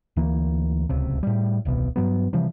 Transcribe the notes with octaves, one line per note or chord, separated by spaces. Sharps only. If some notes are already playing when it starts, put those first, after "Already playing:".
D2 E3 A#3
D1 C#2 C3
A2 G3
D#1 C2 B2
G2 F#3 B3
C3 E3 F3 G3